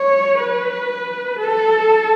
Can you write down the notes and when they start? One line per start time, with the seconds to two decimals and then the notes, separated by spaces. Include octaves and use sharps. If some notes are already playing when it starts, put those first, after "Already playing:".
Already playing: C#5
0.40 B4
1.40 A4